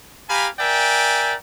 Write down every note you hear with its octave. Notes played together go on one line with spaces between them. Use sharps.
G4 F5 G#5 A#5 B5
A#4 D5 E5 G5 G#5